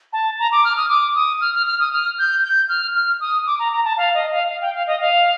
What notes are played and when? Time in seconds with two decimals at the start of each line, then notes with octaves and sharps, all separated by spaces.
0.13 A5
0.39 A#5
0.52 D6
0.64 F6
0.77 D#6
0.89 D6
1.15 D#6
1.41 F6
1.54 F6
1.66 F6
1.80 D#6
1.92 F6
2.18 G6
2.43 G6
2.69 F6
2.94 F6
3.20 D#6
3.47 D6
3.59 A#5
3.72 A#5
3.84 A5
3.97 F5
4.14 D#5
4.31 F5
4.48 F5
4.62 G5
4.74 F5
4.87 D#5
5.00 F5